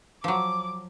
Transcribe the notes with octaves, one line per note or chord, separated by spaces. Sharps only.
F3 F#3 D6